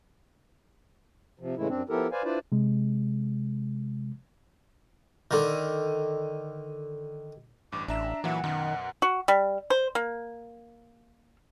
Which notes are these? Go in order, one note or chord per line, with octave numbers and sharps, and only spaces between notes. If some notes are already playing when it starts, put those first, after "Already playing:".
C3 F3
A2 C#3 E3 G#3 A3 E4
F#2 C4 D4
F3 B3 E4 G4 A4 A#4
B4 C5 D5 F5 G#5
D4 E4 F4 B4 C5 D5
C3 G#3
D3 D#3
A1 G2 D6
A1 D4 E5 A#5 E7
A#2 E3 F#3 E5 F#5
F#2 B2 D#3
F#4
G3
C5
A#3